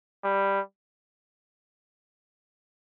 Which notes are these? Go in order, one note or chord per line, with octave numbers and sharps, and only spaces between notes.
G3